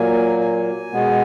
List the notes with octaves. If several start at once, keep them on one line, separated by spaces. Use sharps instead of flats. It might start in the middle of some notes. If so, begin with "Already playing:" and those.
Already playing: A#2 F#3 A#3 G#5
G#5
B2 G#3 B3